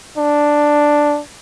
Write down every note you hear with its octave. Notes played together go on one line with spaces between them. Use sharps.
D4